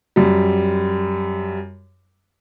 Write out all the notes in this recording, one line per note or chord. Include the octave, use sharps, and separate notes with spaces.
F#2 G3